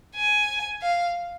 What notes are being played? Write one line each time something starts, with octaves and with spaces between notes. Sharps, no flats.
G#5
F5